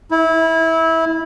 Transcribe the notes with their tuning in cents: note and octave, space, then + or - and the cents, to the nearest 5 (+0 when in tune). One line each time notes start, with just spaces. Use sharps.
E4 -20